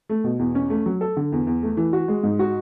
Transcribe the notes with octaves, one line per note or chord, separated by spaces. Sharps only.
A3
B2
E2
C#4
A3
F#3
A4
D3
E2
E2
A3
E3
F#4
G#3
G#2
F#4